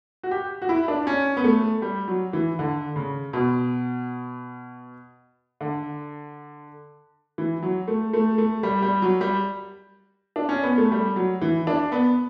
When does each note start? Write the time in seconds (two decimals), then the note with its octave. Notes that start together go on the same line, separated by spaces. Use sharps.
0.23 F#4
0.31 G4
0.62 F#4
0.69 E4
0.88 D4
1.07 C#4
1.37 B3
1.44 A3
1.82 G3
2.08 F#3
2.33 E3
2.59 D3
2.96 C#3
3.33 B2
5.61 D3
7.38 E3
7.63 F#3
7.88 A3
8.13 A3
8.38 A3
8.63 G3
8.82 G3
9.02 F#3
9.21 G3
10.36 D4
10.49 C#4
10.63 B3
10.78 A3
10.92 G3
11.16 F#3
11.42 E3
11.67 D4
11.92 B3